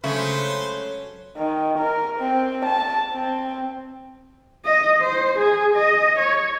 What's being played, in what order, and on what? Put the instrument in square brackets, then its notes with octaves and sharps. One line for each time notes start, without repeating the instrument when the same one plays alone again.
[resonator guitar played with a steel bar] C#3 G#3 A3 [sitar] F#3 C#4 [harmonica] B4 C5 C6
[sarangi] D#3
A#4
C4
A5
C4
[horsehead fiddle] D#5
C5
G#4
D#5
C#5